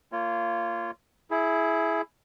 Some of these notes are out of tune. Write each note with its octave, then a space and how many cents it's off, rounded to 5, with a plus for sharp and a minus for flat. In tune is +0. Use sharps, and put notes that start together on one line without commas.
A#3 -25 F4 -20 C#5 +0
E4 +0 G#4 +20